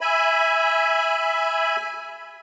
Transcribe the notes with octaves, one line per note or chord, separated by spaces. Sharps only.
E5 G#5 B5